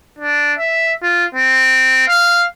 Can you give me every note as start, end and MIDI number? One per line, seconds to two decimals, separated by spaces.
0.18 0.53 62
0.58 0.93 76
1.03 1.25 65
1.35 2.07 60
2.08 2.45 77